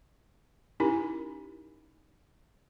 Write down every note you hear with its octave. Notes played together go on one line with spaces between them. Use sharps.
C#4 D#4 E4 G4 A#4